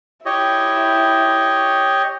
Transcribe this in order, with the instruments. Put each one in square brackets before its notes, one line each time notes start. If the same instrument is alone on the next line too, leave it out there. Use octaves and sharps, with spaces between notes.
[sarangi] E4 [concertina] G4 C#5 D#5